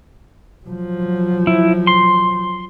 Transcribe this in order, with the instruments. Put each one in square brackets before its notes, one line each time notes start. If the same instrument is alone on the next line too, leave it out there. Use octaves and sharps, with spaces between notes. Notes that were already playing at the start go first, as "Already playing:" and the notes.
[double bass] F3 F#3
[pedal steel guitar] E4
C6